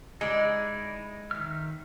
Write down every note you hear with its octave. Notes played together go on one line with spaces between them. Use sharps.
G#3 D#4 E4 D5
D#3 E5 F6